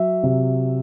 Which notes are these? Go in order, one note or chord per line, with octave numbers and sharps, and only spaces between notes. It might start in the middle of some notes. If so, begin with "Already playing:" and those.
Already playing: F#3 E5
C3